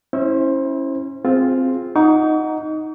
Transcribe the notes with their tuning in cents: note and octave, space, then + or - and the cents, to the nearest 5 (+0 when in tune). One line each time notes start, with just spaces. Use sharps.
C#4 -20 E4 -20 C5 +15
C4 +0 F4 +5 G#4 +0
D#4 +0 F#5 +0 C#6 +45